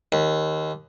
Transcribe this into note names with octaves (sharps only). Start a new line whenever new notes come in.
D#2